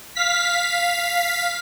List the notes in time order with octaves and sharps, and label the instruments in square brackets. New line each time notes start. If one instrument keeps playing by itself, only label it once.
[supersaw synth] F5 B6